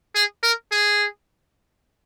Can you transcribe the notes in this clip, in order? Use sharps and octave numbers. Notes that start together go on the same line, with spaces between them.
G#4
A#4
G#4